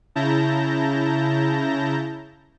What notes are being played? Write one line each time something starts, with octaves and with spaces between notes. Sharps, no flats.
C#3 E4 A5 A#5 G6 A#6